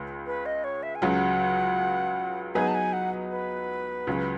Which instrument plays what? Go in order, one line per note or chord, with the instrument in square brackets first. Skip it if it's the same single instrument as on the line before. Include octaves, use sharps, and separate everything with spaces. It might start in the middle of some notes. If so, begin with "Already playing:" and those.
Already playing: [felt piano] C#2 C#3 G#3
[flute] B4
D#5
C#5
E5
G#5
[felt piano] C#2 C#3 F#3 [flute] F#5
[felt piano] F#3 B3 D#4 G#4 B4 [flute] G#5
[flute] A5
G#5
F#5
B4
[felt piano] C#2 C#3 F#3